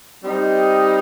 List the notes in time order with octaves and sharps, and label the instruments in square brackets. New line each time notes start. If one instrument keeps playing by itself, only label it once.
[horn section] G3 C4 D#4